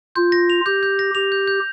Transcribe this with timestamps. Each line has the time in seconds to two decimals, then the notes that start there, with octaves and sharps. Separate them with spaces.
0.16 F4 G6
0.32 A#6
0.50 F7
0.66 G4 G6
0.83 G6
0.99 A#6
1.15 G4 F7
1.32 G6
1.47 G6